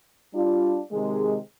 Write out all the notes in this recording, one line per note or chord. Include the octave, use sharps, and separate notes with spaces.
G3 D4 F4
C3 D#3 G#3